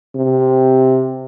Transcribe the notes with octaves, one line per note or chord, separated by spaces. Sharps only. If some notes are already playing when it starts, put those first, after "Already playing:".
C3